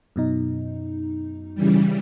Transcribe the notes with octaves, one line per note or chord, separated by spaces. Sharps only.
F#2 B2 D#4
C#3 E3 G3